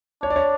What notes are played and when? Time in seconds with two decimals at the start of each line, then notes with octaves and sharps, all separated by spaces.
0.23 D4 C#5
0.30 D5
0.36 C#5